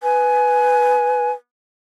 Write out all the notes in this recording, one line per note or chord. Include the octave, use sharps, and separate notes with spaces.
B4 G#5